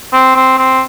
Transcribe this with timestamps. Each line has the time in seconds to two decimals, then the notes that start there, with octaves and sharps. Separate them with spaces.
0.13 C4
0.36 C4
0.58 C4